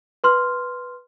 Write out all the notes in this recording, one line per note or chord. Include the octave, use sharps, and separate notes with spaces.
B4 C6 F6